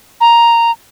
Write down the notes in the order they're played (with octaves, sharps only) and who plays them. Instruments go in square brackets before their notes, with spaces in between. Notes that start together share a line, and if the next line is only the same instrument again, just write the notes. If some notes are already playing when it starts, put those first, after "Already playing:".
[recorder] A#5